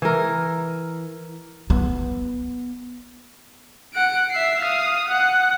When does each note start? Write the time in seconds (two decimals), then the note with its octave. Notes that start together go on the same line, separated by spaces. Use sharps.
0.02 E3 A#4
1.70 B3
3.94 F#5 D7
4.31 E5 C7
4.61 F5 D#6
5.08 F#5